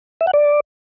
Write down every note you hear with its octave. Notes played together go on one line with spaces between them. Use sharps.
E5
F#5
D5